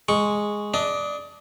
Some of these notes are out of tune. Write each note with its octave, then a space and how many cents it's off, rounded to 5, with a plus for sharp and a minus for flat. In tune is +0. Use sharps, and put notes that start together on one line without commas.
G#3 +0 C#6 +0
D4 +0 D#5 +25